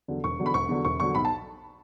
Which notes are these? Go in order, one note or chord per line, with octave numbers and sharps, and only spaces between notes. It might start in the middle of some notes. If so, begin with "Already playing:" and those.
E2 D3 F#3
E1 C#6
E2 D3 F#3
B5
E1 C#6
E2 D3 F#3
E1 C#6
E2 D3 F#3 C#6
B1 B5
A5